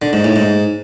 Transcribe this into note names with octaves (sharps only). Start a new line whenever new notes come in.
D3
G#2
A2
G#2